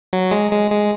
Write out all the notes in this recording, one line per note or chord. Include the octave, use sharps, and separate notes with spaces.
F#3
G#3
G#3
G#3